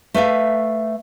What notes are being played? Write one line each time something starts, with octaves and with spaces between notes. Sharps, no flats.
A3 B4 E5 F5